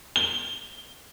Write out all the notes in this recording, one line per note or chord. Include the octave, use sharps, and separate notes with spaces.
G7